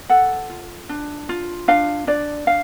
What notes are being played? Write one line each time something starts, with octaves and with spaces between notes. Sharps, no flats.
A4 F#5
F4
D4
F4
D4 F5
D4 D5
D4 F5